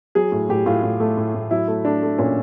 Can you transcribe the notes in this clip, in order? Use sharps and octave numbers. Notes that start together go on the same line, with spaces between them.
F#3 G#4
A2
A2 G4
A2 F4
A2
A3
A2
A2
F#3 E4
A3
A3 D4
A3
A#2 C#4